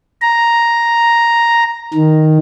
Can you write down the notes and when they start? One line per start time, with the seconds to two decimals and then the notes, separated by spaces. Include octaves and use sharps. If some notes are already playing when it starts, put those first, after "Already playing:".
0.21 A#5
1.94 D#3